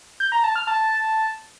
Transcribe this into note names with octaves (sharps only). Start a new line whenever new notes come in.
G6
A#5
A5
F6
A5